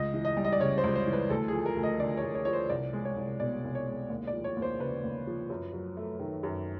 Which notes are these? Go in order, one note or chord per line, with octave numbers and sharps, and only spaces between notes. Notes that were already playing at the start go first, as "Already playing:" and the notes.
Already playing: C#2 D#5
E3
D#5
G3
D#5
D5
C#3 C#5
C5
C#2
C5
E3
B4
D2 A4
F3 G#4
A#4
D2
D#5
D3 D5
C#5
D2
C#5
F3 C#5
C5
C2 D5
G#3
C#5
C2
B2 D5
C2
C#5
G#3
D#2
D5
F3
C#5
D#2
C5
C#3 B4
D#2
F3
F#2
F#3
A3
D#3
F#2